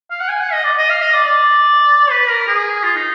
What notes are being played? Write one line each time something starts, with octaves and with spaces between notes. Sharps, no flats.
F5
F#5
G#5
F#5
D#5
D5
D#5
F5
D#5
D5
D5
B4
A#4
G#4
F4
D#4